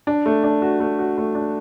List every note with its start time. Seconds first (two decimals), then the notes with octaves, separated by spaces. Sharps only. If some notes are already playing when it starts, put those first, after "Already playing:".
0.07 D4
0.26 A3
0.44 D4
0.62 F#4
0.80 A3
0.99 F#4
1.18 A3
1.35 D4